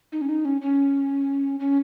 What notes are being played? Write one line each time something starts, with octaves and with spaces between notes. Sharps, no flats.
D#4
C#4
D#4
C#4
C#4
C#4